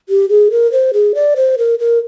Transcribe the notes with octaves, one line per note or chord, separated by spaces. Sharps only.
G4
G#4
A#4
C5
G#4
D5
C5
A#4
A#4